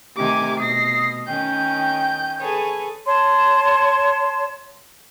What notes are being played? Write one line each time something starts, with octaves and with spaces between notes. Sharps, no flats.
C3 D#3 A3 G4 G#5 D6
B2 D#6 A#6 C7
D#3 C#4 G5 G6
G#4 A4 B4 C#5
C#5 A5 C6